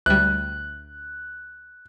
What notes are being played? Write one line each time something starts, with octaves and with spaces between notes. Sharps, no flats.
D2 G3 F#6